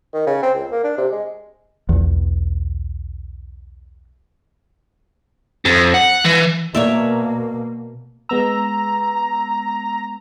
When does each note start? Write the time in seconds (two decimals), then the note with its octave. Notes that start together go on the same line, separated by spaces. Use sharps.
0.14 D#3
0.27 C#3
0.43 C4
0.55 C#2
0.72 A#3
0.84 D4
0.98 C3
1.11 G#3
1.89 B1 E2
5.65 F2
5.94 F#5
6.25 E3
6.75 B2 A#3 C#5 D5 E5
8.29 G#3 B3 A#5 E6